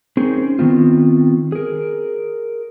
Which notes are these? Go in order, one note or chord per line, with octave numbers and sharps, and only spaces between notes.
C4 C#4 D#4 G#4 A#4 C5
D#3 B3 C4 F4
G#4 A#4